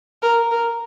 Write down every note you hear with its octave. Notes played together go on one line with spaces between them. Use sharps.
A#4
A#4